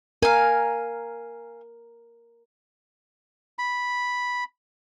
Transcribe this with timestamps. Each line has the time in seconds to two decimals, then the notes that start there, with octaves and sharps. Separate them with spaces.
0.22 A#4 F5 G#5
3.59 B5